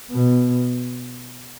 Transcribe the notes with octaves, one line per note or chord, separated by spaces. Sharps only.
B2